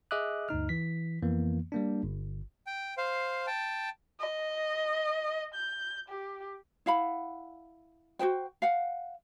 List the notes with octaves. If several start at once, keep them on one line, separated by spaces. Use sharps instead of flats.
G#4 D#5 E5 D6 D#6 F#6
D2 G2 D#4 F6
E3 B6
F2 E3 A#3 B3
G3 A#3 D4
G1
G5
C5 F5
G5 A5
D#5
G6
G4
E4 F5 F#5 B5
F#4 G#4 C5 G5
F5 F#5